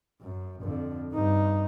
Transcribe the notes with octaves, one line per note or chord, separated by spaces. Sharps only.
F#2
F2 D3
G2 D#4